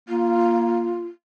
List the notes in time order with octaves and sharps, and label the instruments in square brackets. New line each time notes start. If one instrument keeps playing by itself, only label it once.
[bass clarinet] A#3 [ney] F4